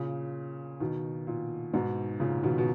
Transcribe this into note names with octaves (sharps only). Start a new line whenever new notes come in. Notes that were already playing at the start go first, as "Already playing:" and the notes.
Already playing: A#2 C#3
B2 D#3
A#2
G#2 B2
A#2 C#3
B2 D#3
B2